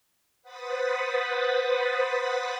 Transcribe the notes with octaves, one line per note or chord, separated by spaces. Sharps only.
B4 C5 F#5 D#6 A6 B6